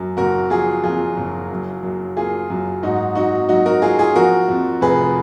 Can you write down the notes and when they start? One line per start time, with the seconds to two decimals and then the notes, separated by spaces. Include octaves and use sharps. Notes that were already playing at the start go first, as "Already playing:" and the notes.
Already playing: F#2
0.17 F#1 F#4 A#4
0.50 F3 F4 G#4
0.84 F2 F4 G#4
1.17 F#1
1.51 F#2
1.83 F#2
2.17 A#3 F4 G#4
2.50 F#2
2.83 G#2 D#4 F#4
3.15 F#3 D#4 F#4
3.49 F#3 D#4 F#4
3.66 F#4 A#4
3.82 F#3 F4 G#4
3.99 F4 G#4
4.15 F3 F#4 A#4
4.48 F2
4.81 F1 G#4 B4